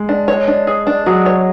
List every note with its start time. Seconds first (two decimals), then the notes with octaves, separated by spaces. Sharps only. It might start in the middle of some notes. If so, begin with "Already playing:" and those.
Already playing: G#3
0.09 D4
0.28 C#5
0.48 D4
0.67 G#4
0.87 D4
1.06 F#3 G#4
1.26 C#5